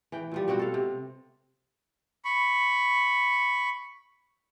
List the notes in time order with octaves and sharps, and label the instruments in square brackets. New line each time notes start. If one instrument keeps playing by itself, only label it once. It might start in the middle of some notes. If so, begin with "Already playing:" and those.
[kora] E3 G5
A#2 F3 G3
B2 C4 F#4 G5
A4 F5
C3
[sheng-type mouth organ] B5 C#6